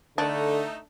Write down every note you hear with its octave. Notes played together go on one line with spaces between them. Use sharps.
D3 A3 D4 D#4 A4